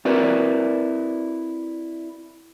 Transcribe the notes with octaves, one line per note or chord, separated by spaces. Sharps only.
C4 E4 F#4 A#4 B4 D5